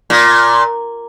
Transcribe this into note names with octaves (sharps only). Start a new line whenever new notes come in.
A#2